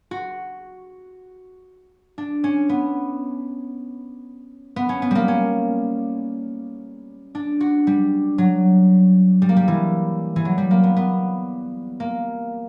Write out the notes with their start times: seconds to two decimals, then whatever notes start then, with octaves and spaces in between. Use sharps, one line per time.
0.11 F#4
2.18 D4
2.44 C#4
2.69 B3
4.76 B3
4.89 C#4
5.02 B3
5.11 G3 A#3
5.28 C#4
7.35 D4
7.60 F#4
7.87 G3
8.38 F#3
9.42 G3
9.49 A#3
9.57 G3
9.68 E3
10.36 E3
10.45 F#3
10.58 G3
10.71 A#3
10.83 B3
10.96 B3
12.00 A#3